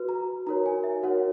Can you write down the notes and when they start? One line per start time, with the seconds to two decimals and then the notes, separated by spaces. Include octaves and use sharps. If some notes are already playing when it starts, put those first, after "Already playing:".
Already playing: F#4 B4
0.09 A#5
0.47 D#4 F#4 A#4 C#5 A#5
0.66 G#5
0.84 E5
1.02 D#4 F#4 A#4 C#5 F#5